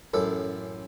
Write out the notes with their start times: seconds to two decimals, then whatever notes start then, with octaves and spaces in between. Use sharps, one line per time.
0.14 A1 F#2 A4